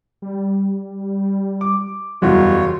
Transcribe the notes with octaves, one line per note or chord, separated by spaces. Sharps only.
G3
D6
F#1 E2 G3 F4 F#4 C#5